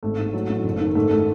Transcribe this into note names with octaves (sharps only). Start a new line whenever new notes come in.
G#1 A3
G#2
F#3
A1
F#1
D#3
G#2 A3
D#3 A3